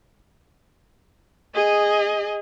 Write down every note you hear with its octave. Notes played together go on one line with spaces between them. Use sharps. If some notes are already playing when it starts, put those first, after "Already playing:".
G#4 D#5